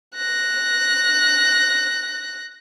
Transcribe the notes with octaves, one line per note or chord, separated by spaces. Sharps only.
F#6 A#6